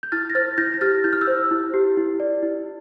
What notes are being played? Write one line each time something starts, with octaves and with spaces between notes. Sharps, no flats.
G6
E4 F6 A6
A#6
C5 F6 A6
E4 G6 A#6
A#6
G4 F6 A6
E4 G6
F6
E6 G6
C5
E4
G4
E4
D5
E4